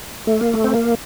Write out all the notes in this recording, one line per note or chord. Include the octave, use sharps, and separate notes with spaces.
A3
A#3
A3
C4
A#3